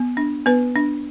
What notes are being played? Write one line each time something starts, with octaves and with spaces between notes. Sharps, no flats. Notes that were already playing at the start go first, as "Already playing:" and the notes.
Already playing: B3
D4
B3 B4
D4